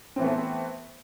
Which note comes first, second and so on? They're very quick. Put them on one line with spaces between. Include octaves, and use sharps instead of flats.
C4 E3 B3 A3